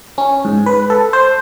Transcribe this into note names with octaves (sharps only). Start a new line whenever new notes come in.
C#4
G#2
B4
A4
C5